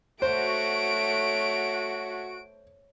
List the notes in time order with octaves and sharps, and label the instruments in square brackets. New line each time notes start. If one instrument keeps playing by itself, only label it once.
[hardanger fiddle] A3 C#5 [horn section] F#4 [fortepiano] C5 [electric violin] D7